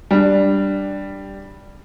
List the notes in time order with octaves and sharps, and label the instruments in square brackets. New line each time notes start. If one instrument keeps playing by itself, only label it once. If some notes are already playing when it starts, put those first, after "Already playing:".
[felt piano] G3 D4